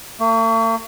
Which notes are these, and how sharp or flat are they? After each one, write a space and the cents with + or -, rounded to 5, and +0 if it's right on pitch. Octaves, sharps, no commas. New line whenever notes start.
A3 +45